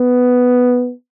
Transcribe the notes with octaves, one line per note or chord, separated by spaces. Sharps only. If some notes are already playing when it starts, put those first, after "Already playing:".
Already playing: B3